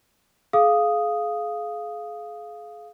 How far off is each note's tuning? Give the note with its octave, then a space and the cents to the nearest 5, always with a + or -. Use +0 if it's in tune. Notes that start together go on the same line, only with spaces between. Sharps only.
G#4 +35 F5 +0 D#6 +0